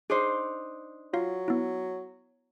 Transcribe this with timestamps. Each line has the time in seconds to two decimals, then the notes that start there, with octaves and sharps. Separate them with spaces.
0.10 D4 D#4 G#4 C5
1.13 F#3 F4 F5
1.48 B3 E4